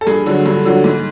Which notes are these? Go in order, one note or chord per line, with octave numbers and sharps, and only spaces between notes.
A4
G2 G#4
D3 F#3
G2
D3 F#3
G#2